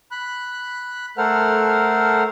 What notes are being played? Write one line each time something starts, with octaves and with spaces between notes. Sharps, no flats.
B5 F#6
A3 A4 A#4 C5 F#5 F6